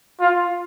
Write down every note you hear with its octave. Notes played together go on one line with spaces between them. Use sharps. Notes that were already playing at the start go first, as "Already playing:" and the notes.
F4